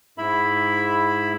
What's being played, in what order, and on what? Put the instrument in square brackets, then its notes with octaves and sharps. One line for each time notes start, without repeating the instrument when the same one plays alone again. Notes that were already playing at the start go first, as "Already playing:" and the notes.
[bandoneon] G#2 E4 E5 B5